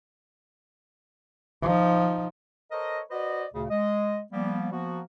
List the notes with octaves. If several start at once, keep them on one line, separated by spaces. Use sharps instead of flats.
F3 D#4
A4 A#4 C5 C#5 D#5
F#4 B4 C5 D5 D#5
D2 A#2 C#3
G#3 D#5
F3 G3 A#3 B3
F3 A#3 B3 F#4